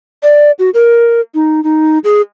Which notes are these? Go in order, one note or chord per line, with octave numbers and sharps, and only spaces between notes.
D5
F#4
A#4
D#4
D#4
G#4